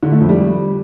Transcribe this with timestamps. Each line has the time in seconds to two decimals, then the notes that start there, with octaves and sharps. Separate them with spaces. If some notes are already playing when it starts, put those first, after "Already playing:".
0.03 D3
0.11 A3
0.20 F2
0.29 G3